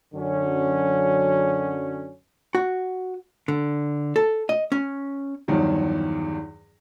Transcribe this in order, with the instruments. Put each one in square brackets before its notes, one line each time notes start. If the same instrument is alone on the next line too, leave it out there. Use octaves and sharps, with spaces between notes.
[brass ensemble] F#2 D3 F#3 C#4
[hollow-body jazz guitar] F#4
D3
A4
D#5
C#4
[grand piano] E2 G2 D#3 F3 F#3